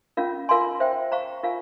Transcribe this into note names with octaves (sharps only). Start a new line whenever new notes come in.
C#4 F4 A#4 F5
F4 A#4 F5 G#5 C6
C5 E5 G5
C5 F5 A#5 C#6
F4 A#4 F5 G#5